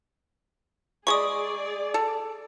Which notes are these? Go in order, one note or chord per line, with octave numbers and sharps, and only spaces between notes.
G#3 G#4 D5 B5 C#6 D#6
A4